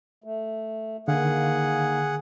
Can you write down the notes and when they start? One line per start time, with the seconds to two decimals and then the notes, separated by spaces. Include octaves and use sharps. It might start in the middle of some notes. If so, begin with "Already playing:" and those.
0.24 A3
1.08 D3 D#3 A#3 G#4 F5 F#5